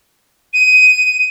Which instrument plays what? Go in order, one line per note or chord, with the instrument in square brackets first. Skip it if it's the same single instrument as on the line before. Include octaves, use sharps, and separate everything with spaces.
[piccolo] D#7